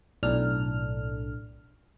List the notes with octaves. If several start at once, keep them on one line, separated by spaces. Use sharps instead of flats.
B1 A2 D4 A4 F6